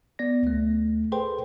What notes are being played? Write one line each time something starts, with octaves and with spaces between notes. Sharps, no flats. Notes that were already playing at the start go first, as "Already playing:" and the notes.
B3 D5 A#6
D2 A3
G#4 A4 B4 C5 G5 C6